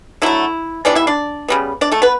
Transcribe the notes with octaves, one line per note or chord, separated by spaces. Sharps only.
D3 F#3 A3 E4 E5
E3 G3 B3 D4 D5
E4 E5
D4 D5
C#3 G3 B3
D4 D5
A3 A4
B3 B4